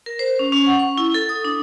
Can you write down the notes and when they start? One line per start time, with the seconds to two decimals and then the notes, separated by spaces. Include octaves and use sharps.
0.06 A#4
0.19 C5
0.39 C#4
0.52 C#4
0.66 F#5
0.79 C#6
0.98 E4
1.14 A4
1.29 D#6
1.45 D4